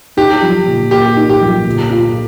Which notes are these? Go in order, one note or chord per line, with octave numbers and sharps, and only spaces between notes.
D#4 G4
F3
A#2
A#3 G4
D#4
G4
F3
A#2
F4